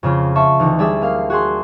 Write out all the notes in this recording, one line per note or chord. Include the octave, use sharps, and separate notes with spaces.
F2 C#3 F4
F4 E5 A5 C#6
D2 E3 D#4
G3 D4 G#4 E5 E6
A#3 F5
F#4 G#4 C6